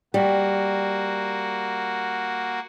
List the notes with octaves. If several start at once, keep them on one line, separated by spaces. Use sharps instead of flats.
G3 A#3 F#4